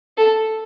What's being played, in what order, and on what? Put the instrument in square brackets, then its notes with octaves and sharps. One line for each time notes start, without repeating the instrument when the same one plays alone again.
[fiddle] A4